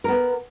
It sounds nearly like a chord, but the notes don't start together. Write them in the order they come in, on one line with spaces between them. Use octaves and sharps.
A#4 B3 A#3